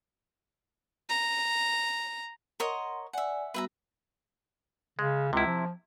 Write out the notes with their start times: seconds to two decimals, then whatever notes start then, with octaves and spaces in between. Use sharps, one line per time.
1.10 A#5
2.60 A#4 C#5 D#5 F#5 C6
3.13 D5 E5 F#5 G#5
3.54 G3 B3 F#4 B4 E5 A#5
4.99 C#3 G#3
5.33 C#2 C3 E4
5.46 F3